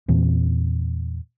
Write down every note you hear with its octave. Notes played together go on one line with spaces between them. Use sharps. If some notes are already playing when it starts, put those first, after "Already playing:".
E2 A#2 E3 C4